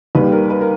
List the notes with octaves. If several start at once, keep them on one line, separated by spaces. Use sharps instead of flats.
D#2 D#3 G3 B4
A#4
B4
A#4